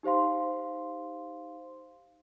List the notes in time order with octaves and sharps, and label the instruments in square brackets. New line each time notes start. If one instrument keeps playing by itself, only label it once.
[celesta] D#4 G4 C5 F5 C6